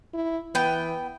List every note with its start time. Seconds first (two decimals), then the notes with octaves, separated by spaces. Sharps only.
0.14 E4
0.55 E3 B3 G5